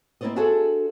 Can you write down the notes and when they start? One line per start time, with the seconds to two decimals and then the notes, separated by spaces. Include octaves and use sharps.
0.21 A#3 C4 E4 C5 D5 D#5
0.36 D4 F#4 G#4 A4 C5 E5